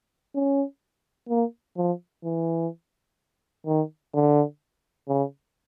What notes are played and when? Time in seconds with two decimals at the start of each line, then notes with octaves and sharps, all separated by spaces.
0.35 C#4
1.29 A#3
1.77 F3
2.24 E3
3.67 D#3
4.14 D3
5.08 C#3